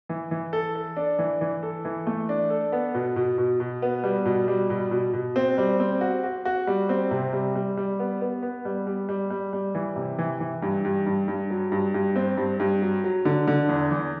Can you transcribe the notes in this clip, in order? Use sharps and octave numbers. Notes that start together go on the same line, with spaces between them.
E3
E3
A4
A4
D4
E3
E3
A4
E3
A3
D4
A4
B3
B2
B2
B2
B2
B3
G3
B2
G3
B2
B2
B2
C4
G3
C4
F#4
F#4
F#4
G3
C4
C3
G3
G3
G3
B3
B3
B3
G3
G3
G3
G3
G3
E3
C3
E3
E3
G2
G2
G2
G2
F#3
G2
G2
C4
G2
G2
F#3
F#3
D3
D3
E2
E2